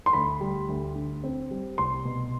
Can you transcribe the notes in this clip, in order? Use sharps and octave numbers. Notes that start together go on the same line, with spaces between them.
C6
D2 B5
G3
D2
D3
C4
G3
C2 C6
B2